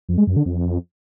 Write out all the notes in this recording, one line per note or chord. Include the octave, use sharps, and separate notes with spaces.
F2
G#3
F#2
D3
F2